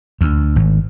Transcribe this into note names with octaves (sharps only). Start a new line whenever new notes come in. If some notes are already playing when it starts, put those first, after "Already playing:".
D2
G#1